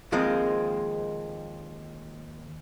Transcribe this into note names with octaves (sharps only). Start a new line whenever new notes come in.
D#2 F3 G#3 A#3 C4